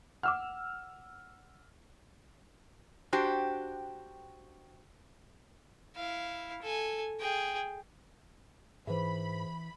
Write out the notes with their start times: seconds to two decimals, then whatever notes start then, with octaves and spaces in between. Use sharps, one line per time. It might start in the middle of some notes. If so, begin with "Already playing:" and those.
0.23 F#5 D6 E6 F6
3.13 D4 F#4 G4 C5 G5
5.96 E4 F5
6.63 A4 G#5
7.20 G#4 G5
8.87 G#2 E3 G#4 B4 C5 E5 B5